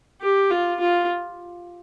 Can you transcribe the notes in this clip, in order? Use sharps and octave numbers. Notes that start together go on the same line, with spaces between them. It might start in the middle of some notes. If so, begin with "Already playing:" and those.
G4
F4
F4